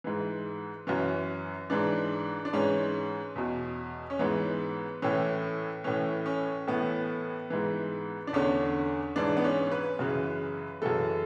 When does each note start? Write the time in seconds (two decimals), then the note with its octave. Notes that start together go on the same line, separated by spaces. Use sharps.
0.04 G#2 E3
0.87 F#2 E3 C#4
1.70 G#2 E3 D4
2.45 D4
2.53 G#2 E3 C#4
3.36 E2 B2
4.10 C#4
4.19 G#2 E3 B3
5.02 A2 E3 C#4
5.84 A2 E3 C#4
6.26 C#4
6.67 A2 E3 B3
7.50 G#2 E3
8.27 D4
8.33 E2 D3 C#4
9.16 G#2 E3 D4
9.37 B3
9.44 C#4
9.72 B4
9.99 F#2 C#3 E3
10.82 F#2 C#3 E3 A4